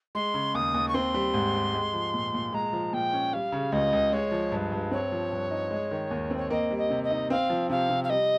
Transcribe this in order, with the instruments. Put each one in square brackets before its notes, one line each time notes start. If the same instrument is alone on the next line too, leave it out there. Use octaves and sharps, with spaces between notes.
[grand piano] G#3 [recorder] C6
[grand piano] C#3
[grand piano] D#2 [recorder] D#6
[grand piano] D#2
[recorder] C#6
[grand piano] C4 [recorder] C6
[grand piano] G3
G#2
G4
G#3
F3
A#2
A#2
[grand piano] G#3 [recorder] A#5
[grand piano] F3
[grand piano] A#2 [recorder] G5
[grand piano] C#4
[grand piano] G3 [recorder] F5
[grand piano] C#3
[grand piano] C#2 [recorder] D#5
[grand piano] C#2
[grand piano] G#3 [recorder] C#5
[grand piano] F3
G2
G2
[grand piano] C4 [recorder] C#5
[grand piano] F3
G2
D#4
G#3
D#3
D#2
C4
[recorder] C#5
[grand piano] A#3 [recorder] D#5
[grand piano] G3
[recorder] D#5
[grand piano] C3
[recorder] D#5
[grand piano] D#4
[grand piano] C4 [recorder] F5
[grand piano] F3
[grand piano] C3 [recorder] F5
[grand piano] C3
[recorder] F5
[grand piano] G3 [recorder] D#5